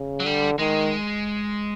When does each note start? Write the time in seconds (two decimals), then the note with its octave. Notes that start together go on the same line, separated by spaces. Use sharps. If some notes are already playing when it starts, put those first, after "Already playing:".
Already playing: C#3
0.20 F#3
0.25 D3 G3
0.59 D#3 G#3